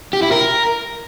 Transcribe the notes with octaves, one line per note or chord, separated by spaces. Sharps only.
G4
E4
A#4